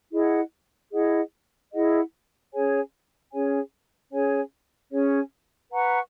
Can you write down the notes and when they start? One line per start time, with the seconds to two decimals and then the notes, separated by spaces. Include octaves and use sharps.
0.12 E4 G#4 D#5 F#5
0.93 E4 G#4 D#5 F#5
1.72 E4 G#4 D#5 F#5
2.52 C#4 G#4 C#5 G#5
3.32 C#4 G#4 C#5 G#5
4.12 C#4 G#4 C#5 G#5
4.91 C#4 G#4 C#5 G#5
5.71 B4 F#5 A#5 C#6